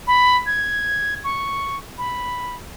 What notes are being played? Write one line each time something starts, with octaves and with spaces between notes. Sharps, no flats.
B5
G#6
C#6
B5